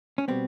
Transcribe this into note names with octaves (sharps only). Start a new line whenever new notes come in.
C#4
B2 G3 B3 C4